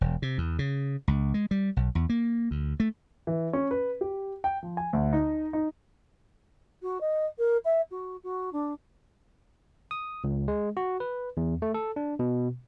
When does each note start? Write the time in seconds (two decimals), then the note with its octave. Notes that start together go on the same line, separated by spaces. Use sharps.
0.01 E1
0.22 C3
0.38 E2
0.59 C#3
1.08 C#2
1.34 G#3
1.51 G3
1.76 B1
1.95 E2
2.09 A#3
2.51 D2
2.80 A3
3.27 E3
3.53 C#4
3.71 B4
4.01 G4
4.44 G5
4.63 F3
4.77 G#5
4.93 D2
5.13 D#4
5.53 D#4
6.82 F#4
7.01 D#5
7.38 A#4
7.65 E5
7.91 F#4
8.23 F#4
8.52 D4
9.91 D#6
10.24 C#2
10.48 G#3
10.77 F#4
11.00 B4
11.37 E2
11.62 A3
11.74 A4
11.96 D4
12.19 B2